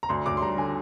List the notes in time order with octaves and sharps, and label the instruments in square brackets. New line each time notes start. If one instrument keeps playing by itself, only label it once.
[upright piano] A#5
D2 C6
D2 D6
C6
G3 A#5
D3 G#5